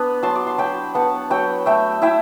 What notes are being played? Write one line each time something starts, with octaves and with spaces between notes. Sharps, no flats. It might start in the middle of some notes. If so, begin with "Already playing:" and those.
Already playing: B3 D4 B5
F#3 A5 C6
D6
C6
F#3 G5 B5
B3 F#5 A5
F#3 G5 B5
A3 E5 G5
E4 E5 G5